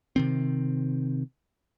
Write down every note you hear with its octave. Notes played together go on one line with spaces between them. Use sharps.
C3 D#3 C4